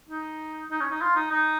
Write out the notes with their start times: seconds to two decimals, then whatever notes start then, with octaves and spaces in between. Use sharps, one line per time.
0.09 D#4
0.71 D#4
0.80 C#4
0.91 D#4
1.01 F4
1.16 D#4
1.32 D#4